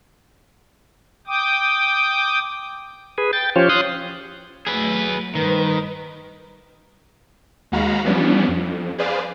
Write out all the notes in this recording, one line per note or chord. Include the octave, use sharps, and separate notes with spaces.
G5 D6 D#6
G#4 B4
G5 A6
F3 C#4 F4 G4 C5 C#5
F5 C6 D#6 F#6 G6
F#3 A3 G#4 B4
G2 D#3 B4 C5
D#2 G#3 F#4 F5 A#5 B5
E3 F3 G3 B3 C#4 D4
F2
G#4 B4 C5 D5 F5